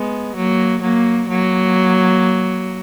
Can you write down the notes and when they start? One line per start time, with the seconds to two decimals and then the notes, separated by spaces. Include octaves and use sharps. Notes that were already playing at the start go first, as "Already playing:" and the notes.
Already playing: G#3 B3
0.36 F#3 A#3
0.82 F#3 A#3
1.28 F#3 A#3